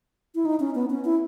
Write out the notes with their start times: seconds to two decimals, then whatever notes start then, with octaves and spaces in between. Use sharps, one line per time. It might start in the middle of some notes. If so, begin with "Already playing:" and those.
0.35 E4
0.45 D#4
0.60 C#4
0.75 B3
0.90 C#4
1.05 E4